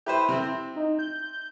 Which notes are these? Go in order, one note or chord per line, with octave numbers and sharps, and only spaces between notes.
E4 G4 B4 C5
C3 C4
D#4
G6